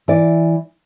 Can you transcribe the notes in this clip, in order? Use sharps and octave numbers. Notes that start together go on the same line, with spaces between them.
E3 D5